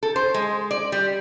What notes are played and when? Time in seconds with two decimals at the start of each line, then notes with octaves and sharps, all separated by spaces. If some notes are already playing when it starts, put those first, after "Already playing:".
0.03 A4
0.16 C5
0.34 G#3
0.71 D5
0.92 G3